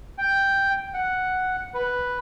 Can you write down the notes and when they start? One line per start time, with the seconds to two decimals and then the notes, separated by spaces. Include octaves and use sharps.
0.18 G5
0.94 F#5
1.74 B4